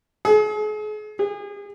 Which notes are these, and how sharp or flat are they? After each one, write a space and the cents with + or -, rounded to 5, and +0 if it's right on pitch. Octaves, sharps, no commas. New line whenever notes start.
G#4 +40
G#4 -35